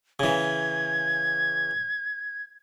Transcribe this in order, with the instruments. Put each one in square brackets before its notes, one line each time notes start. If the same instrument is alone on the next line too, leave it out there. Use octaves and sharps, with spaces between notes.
[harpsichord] C#3 E3 [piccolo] G#6